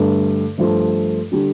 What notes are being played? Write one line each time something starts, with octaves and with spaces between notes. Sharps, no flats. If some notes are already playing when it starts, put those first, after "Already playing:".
Already playing: G2 D3 A3
G2 F3 A3 F4
D3 G3 D4